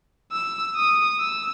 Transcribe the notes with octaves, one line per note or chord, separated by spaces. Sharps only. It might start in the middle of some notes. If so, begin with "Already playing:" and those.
E6
D#6
E6